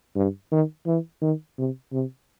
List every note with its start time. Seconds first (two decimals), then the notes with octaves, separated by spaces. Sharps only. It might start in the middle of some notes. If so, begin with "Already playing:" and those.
0.16 G2
0.52 D#3
0.87 E3
1.22 D#3
1.58 C3
1.93 C3